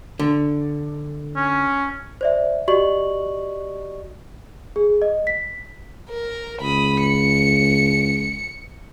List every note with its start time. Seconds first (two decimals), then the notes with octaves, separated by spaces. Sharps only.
0.19 D3
1.36 C#4
2.21 C5 D5 E5
2.68 F#4 G4 D5 D#5 C#6 F#7
4.76 G#4
5.02 D#5
5.27 B6
6.10 A#4
6.62 C#2 B5 D#6
7.03 C#7